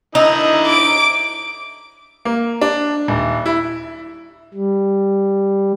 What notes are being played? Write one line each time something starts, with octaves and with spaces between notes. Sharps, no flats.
D3 D#4 E4 D#5
D6 D7
A#3
D4
D#1
E4
G3